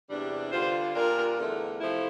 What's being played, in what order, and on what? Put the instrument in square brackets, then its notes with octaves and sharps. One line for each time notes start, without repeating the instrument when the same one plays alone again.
[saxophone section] E2 C3 G3 D4
[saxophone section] D3 G3 D4 F4 [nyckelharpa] C5
[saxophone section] A#2 G3 D4 F4 [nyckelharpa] A#4
[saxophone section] E2 D3 A3
C3 F3 A3 E4